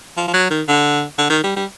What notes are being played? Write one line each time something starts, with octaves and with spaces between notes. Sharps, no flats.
F3
F3
F#3
D#3
D3
D3
D#3
G3
G3